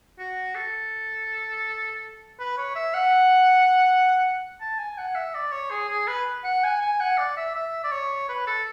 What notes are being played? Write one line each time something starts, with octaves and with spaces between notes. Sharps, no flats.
F#4
A4
B4
C#5
E5
F#5
A5
G#5
F#5
E5
D5
C#5
G#4
G#4
B4
F#5
G#5
G#5
F#5
D5
E5
E5
D5
C#5
B4
A4